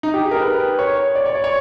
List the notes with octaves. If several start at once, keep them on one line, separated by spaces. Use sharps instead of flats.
D#4
G4
G#4
A#4
B4
C#5
D5
C#5
D5
C#5